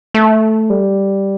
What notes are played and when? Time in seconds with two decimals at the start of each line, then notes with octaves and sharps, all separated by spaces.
0.14 A3
0.70 G3